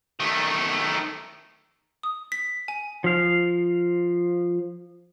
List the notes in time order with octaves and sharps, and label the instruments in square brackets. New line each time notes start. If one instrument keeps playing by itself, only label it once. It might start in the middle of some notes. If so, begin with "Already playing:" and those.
[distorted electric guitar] D#3 A3
[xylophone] D#6
B6
G#5
[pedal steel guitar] F3 F5